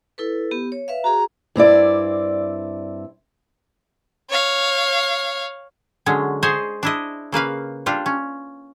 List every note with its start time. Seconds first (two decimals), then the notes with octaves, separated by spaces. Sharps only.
0.18 E4 A4 B4
0.51 B3 G4
0.72 C#5
0.88 B4 E5 F5
1.04 F#4 G#4 A#5
1.56 G2 C4 E4 D5
4.30 C#5 F5
6.06 D3 F#3 G#3 C#4
6.43 G#4 C5 C#5 D#5
6.83 D4 E4 D#5
7.32 C#3 A#3 B4 F5
7.86 G3 D4 F4
8.06 C#4